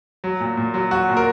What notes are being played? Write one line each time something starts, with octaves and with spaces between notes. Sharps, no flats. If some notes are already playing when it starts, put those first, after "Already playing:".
F#3
A#2
A#2
F#3
F#3 F#4
A#2
A#4